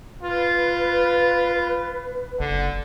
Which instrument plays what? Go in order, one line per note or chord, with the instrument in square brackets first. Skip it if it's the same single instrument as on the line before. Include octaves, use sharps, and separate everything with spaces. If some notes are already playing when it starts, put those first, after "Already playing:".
[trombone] F4 [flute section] B4
[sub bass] F#1 [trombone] D3